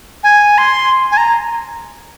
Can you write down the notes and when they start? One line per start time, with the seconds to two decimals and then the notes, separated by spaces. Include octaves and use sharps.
0.24 G#5
0.58 C6
1.12 G#5
1.17 A#5